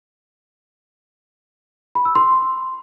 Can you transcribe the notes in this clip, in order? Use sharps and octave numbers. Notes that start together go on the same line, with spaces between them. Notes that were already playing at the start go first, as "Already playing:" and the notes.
B5
E6
C6